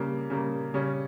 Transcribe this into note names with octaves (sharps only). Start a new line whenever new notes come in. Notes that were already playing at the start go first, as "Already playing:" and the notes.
Already playing: C#3 G3 A#3
C#3 G3 A#3
C#3 G3 C#4